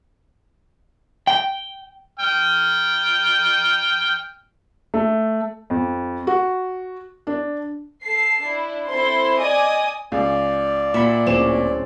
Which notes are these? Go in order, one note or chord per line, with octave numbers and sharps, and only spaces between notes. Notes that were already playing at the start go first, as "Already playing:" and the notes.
G5
G5 F6
A3
F2
F#4
D4
A4 A5 C7
D4 E4
C4 E4 A4 C5 C6
D5 D#5 G#5 D#6
C#2 G#4 D5
A#2 E5 F#5 B5
D1 C4 C#4 D6 E7